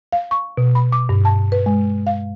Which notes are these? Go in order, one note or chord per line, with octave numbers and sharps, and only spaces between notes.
F5
C#6
B2
B5
D6
G2
A5
B4
G#3
F5